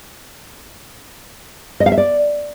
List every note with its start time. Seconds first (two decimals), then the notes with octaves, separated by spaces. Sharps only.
1.80 D#5
1.86 F5
1.92 E5
1.98 D5